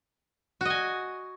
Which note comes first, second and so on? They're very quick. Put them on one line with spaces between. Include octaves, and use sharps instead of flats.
F#4 D#5 G#5